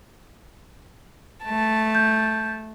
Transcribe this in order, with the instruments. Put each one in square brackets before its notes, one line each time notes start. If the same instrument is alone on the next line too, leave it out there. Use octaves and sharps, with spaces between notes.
[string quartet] A3 A5
[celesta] G6